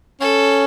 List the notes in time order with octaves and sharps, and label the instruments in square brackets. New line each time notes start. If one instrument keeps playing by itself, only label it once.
[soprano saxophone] C#4 [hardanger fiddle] A4